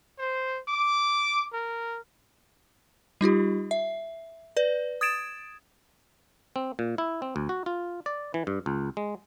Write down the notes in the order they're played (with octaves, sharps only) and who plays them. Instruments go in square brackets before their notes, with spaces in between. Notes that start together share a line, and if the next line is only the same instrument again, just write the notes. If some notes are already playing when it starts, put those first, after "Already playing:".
[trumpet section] C5
D6
A#4
[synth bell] G3 D#4 F4 G4
E5
B4 D5
D#6 G#6 A6 D7 E7
[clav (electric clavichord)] C4
A#2
E4
C4
D2
F#4
F4
D5
E3
G2
C#2
G#3